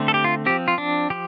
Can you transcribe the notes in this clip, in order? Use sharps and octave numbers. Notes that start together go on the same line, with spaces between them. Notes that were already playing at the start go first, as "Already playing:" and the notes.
Already playing: D3 A3 C4
A4
G4
F4
F3 C4 G4
F4
D4
F3 G4